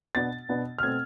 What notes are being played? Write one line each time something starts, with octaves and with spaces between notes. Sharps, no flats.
B2 B3 D4 A6
B2 B3 D4
F6
B2 A3 C4 G#6